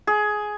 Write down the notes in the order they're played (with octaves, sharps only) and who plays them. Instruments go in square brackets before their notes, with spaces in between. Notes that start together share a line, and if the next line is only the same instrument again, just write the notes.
[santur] G#4